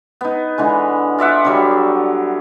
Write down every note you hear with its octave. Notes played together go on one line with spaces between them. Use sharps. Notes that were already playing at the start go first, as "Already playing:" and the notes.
B3 D#4
D3 E3 G#3
F4 D5 E5 F#5
D3 F#3 G3